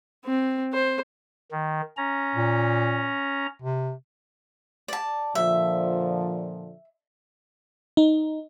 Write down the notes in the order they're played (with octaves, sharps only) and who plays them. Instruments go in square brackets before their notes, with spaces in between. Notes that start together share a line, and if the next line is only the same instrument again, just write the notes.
[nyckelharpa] C4
C5
[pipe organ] D#3
C#4 A#5
[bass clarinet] A#2
C3
[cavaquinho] D5 A5
[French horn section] A#2 D3 F3 [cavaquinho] E5
[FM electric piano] D#4